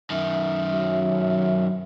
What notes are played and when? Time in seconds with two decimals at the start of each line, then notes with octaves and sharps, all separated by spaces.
0.10 F#2 D#3 E5
0.73 F#3